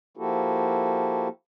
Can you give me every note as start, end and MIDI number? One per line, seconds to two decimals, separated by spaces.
0.17 1.28 53
0.17 1.28 58
0.17 1.28 64
0.17 1.28 66
0.17 1.28 67
0.17 1.28 69